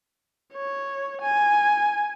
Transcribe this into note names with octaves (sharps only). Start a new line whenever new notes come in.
C#5
G#5